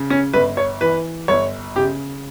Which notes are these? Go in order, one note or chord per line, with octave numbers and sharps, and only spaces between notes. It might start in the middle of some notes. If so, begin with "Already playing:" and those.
Already playing: C#3
C#4
G1 B4
C#5
E3 B4
G1 C#5
C#3 G4